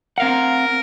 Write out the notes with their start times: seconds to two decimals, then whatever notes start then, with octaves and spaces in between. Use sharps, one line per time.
0.18 C4 A#4 F5 F#5